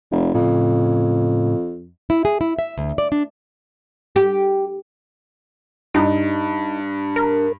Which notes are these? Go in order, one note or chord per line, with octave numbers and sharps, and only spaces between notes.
F1
F2 A2 C#3
E4
G#4
E4
E5
D2
D5
D4
G4
G2 D#4
A#4